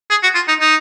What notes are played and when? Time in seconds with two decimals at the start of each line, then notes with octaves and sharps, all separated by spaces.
0.11 G#4
0.23 F#4
0.35 F4
0.48 D#4
0.61 D#4